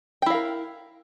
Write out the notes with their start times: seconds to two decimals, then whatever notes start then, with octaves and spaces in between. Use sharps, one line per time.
0.22 G5
0.26 E4
0.30 F5
0.34 A#4